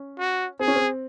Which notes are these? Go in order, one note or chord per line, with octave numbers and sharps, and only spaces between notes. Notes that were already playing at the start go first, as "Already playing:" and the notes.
Already playing: C#4
F#4
C4 G#4
C#4
C4